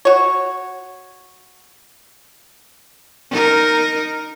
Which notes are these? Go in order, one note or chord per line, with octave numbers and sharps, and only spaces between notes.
F#4 C#5
D#4 A#4